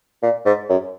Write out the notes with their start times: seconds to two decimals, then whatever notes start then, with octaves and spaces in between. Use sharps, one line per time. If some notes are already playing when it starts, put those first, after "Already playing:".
0.22 A#2
0.45 G#2
0.69 F#2